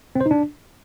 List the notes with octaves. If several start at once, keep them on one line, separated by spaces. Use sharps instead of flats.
C4
C5
D#4
D4